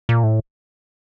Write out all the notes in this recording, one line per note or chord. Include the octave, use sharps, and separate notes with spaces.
A#2
A2